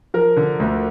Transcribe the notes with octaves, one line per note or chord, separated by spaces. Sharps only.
F3 A#4
D3
D2